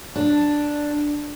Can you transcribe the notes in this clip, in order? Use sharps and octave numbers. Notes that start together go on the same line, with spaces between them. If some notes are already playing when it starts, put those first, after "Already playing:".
D4